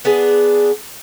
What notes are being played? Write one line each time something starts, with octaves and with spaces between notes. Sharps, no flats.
B3 D4 G#4